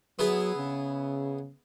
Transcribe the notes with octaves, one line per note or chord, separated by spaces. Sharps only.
F#3 B3 E4 G#4
C#3